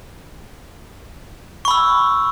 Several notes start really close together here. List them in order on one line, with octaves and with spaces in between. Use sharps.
C#6 B5 E6